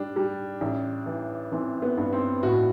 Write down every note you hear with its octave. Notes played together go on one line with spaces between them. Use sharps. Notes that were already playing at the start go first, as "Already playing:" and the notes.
Already playing: G3 D4
G3
A1
E3
E3 C4
B3
G2
C4
A2 F#4